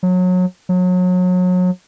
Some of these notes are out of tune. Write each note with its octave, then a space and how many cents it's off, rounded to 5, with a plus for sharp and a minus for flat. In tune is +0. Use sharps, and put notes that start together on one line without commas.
F#3 -25
F#3 -30